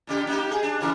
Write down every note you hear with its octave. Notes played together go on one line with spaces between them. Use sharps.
A#2 C#3 G4
A#3 D#4 G4
G#4
D4
C#3 E3 A#4